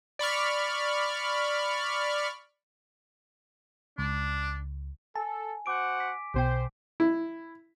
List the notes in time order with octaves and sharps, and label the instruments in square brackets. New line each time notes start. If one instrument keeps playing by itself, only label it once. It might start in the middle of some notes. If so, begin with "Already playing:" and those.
[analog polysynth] D5 B5 C#6 F6
[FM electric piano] C#2 [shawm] D4
[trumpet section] A4 [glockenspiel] G#5 [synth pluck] A5
[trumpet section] F#4 C5 F#5 [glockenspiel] D6 D7
[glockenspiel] B6
[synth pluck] B1 B2 G5 [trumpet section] C5
[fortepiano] E4